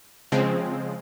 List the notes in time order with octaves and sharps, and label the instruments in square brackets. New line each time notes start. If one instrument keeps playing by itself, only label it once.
[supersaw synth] C#3 F3 G#3 C4